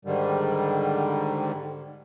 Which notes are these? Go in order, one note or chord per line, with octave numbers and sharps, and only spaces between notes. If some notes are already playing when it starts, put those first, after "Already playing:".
G#2 D3 D#3 G3